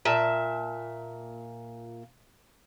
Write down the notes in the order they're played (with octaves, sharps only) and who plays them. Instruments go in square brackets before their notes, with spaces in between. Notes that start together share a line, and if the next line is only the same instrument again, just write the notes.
[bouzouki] A#2 E5 A5